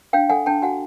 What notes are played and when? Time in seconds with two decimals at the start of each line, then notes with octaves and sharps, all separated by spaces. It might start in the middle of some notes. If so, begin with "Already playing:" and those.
0.13 D4 F5 G5
0.29 A4 F#5 G#5
0.46 D4 G5 A5
0.62 F#4 F#5 G#5